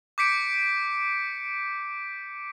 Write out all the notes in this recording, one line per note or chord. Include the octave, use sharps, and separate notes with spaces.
D6 G6 B6 C#7 D7